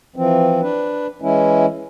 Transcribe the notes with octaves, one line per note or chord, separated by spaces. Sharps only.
E3 F3 C4
D4 B4
E3 G#3 C#4 E4